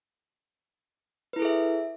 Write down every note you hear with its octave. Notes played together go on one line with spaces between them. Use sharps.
E4 G#4 A4 B4 E5